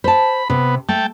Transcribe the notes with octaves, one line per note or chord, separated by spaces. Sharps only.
C5 A5 B5
C3 B3
A3 G5 A5